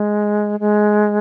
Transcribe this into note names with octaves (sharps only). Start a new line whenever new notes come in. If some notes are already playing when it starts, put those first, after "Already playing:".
Already playing: G#3
G#3